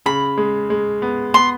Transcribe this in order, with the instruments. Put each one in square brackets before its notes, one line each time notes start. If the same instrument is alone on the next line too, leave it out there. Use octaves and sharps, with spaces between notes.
[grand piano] C#3 [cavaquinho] B5
[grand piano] G#3
G#3
B3
[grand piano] B3 [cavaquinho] C6